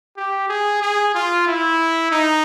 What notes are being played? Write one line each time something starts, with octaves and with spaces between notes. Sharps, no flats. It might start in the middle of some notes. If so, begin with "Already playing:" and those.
G4
G#4
G#4
F4
E4
D#4